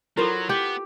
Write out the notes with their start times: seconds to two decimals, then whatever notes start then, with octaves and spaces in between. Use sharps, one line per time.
0.17 F#3 E4 F4 A4 A#4 C5
0.49 B3 G4